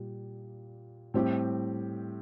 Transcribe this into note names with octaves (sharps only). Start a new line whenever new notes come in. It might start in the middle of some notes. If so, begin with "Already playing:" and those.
Already playing: A#2 G3
A2 G3 C4 G4